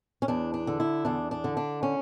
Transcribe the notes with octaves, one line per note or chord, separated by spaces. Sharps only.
C#4
E2 D4
D4
D3
E4
E2 D4
D4
D3
D4
C#4